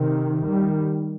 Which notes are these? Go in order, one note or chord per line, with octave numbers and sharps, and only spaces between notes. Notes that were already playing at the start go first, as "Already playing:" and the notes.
Already playing: C3 D#3
D#3 G3